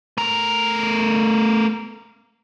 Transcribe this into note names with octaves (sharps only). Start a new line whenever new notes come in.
A3 A#4